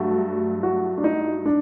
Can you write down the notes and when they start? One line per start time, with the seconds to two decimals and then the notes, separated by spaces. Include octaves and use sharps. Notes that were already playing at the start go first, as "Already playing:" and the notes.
Already playing: G2 F#3 A3 F#4
0.63 F#4
0.98 D4
1.04 D#4
1.46 D4